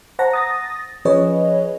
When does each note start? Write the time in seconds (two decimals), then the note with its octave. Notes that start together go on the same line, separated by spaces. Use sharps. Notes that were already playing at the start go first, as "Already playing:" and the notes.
0.19 C5 F#5 A5 A#5 A#6
0.33 D#6 A6 A#6
1.05 F3 C#4 G#4 B4 C#5 D#5